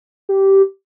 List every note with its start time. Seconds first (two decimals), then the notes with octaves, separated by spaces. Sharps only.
0.29 G4